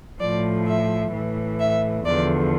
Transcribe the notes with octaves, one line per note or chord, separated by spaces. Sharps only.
A2 F3 D5
E5
A2 E3
E5
E2 D3 F3 D5